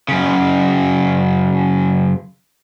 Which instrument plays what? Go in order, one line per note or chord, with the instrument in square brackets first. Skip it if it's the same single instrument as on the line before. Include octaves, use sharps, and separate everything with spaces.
[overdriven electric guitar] F#2 C#3